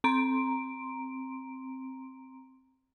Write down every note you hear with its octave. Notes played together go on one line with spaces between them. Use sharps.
C4 A#5 C6 D7